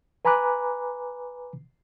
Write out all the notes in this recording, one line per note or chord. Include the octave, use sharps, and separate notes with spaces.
B4 G#5 A#5 B5 D6 F#6